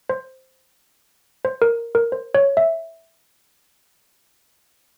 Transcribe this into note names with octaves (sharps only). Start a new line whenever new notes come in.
C5
C5
A#4
A#4
C5
C#5
E5